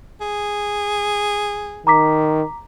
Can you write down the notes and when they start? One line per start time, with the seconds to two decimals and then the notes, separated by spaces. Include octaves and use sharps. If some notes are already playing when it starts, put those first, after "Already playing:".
0.21 G#4
1.87 D#3 A#5 D6 B6